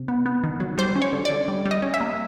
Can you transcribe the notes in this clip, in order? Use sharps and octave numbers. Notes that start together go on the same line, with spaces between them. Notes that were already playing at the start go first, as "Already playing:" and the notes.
Already playing: C3
B3
B3
D#3
F#3
G3 C5
C#4
C#5
D3
D3 D5
G3
G3
D#5
C#4
E5
A#3